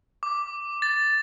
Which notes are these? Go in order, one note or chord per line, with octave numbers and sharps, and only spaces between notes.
D6
A6